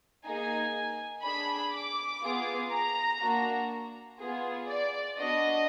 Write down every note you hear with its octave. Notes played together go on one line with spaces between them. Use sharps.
A#3 D#4 G#4 G#5
D4 G#4 B5
D6
B3 F4 G#4
A#5
A#3 D4 F#4
B3 F4 G#4
D5
B3 D4 F#4 D#5